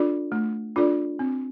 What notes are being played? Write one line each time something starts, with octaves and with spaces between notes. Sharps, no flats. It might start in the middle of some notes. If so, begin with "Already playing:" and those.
Already playing: D4 F4 A4 D5
A3
D4 F4 A4 D5
C4